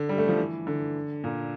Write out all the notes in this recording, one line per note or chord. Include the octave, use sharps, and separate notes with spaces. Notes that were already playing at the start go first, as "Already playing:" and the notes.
Already playing: D3
G3
A3
F3
E3
D3
A#2